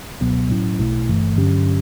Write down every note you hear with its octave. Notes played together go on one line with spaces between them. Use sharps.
C#2 B2 F#3 B3
A2 F#3 C#4 E4
B1 B2 A3 E4
G1 G2 E3 A3
G2 D3 F#3 C#4 G4